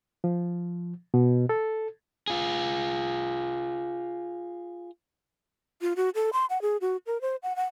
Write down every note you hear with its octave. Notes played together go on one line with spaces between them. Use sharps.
F3
B2
A4
F4 G#4
F4
F#4
A4
C6
F#5
G#4
F#4
A#4
C5
F#5
F#5